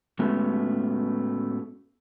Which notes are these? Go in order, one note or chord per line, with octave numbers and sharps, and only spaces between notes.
A2 G#3 A3 B3 C#4 F#4